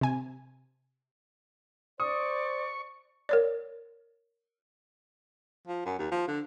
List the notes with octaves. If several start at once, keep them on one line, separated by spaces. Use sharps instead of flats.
C3 G#5
C5 D5 C#6 D#6
A#4 C#5 D5
F3
F#2
D#2
F3
D3